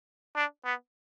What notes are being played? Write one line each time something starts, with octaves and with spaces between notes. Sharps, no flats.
D4
B3